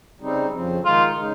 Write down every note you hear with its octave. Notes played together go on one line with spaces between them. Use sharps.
C#3 G3 C4 D#4
F2 C#3 F3 C4
D#3 G#3 D#4 F4
C#3 G#3 D#4